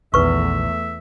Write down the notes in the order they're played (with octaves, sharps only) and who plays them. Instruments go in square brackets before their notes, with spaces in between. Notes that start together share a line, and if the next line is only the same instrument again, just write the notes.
[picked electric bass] A#1 D#3 [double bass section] E2 A3 [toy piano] B4 C#6 [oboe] E5